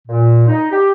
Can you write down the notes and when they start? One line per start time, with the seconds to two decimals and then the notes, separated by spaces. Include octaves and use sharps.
0.08 A#2
0.48 D#4
0.71 G4